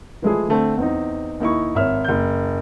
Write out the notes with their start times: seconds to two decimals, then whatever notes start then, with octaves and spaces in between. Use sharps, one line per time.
0.22 E3 F3 G#3 A3 E4 G#4
0.48 D3 A3 C4
0.77 E2 C4 D#4
1.40 D#2 D#4 E4 C#6
1.75 G#1 C#5 E5 F6
2.04 F#1 G6